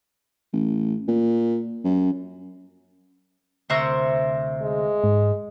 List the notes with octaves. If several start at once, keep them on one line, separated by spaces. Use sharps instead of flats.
A1
A#2
F#2
D2 C3 A#4 C5 E5 C#6
G#3
G#2